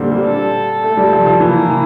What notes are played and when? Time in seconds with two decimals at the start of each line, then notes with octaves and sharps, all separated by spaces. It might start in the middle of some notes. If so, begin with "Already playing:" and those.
Already playing: A#2 D3 G3 A#3 C4
0.12 G3
0.27 A4
0.83 A3
0.97 G3
1.12 F3
1.26 F3
1.40 E3 A#3
1.68 E3